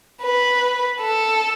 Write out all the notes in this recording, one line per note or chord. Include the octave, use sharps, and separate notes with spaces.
B4
A4